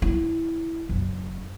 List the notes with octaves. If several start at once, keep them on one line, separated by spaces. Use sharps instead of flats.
E4
F#1